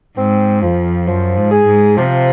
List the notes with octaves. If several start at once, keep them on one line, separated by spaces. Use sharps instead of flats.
G#2 C4
F2 F3
F#2 F3
G#2
G#4
G#2
C3 F3